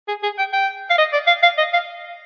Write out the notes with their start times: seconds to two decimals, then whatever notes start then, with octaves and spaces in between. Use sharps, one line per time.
0.08 G#4
0.23 G#4
0.38 G5
0.53 G5
0.90 F5
0.98 D#5
1.13 D5
1.27 F5
1.43 F5
1.58 D#5
1.73 F5